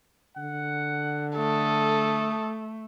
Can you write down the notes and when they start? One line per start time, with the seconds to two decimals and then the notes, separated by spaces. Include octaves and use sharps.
0.37 D3 F#5
1.36 A3 A4 D#6